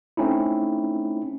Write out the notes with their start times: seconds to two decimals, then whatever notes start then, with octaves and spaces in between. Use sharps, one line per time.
0.17 A3 C4 C#4 D#4 E4